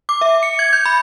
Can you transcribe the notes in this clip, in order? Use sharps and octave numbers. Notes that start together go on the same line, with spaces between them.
D6
E5
C#7
G#6
G6
B5